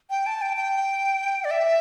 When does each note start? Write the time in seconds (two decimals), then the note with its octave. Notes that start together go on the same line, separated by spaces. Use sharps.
0.10 G5
0.26 A5
0.42 G5
0.57 G5
1.44 D5
1.51 E5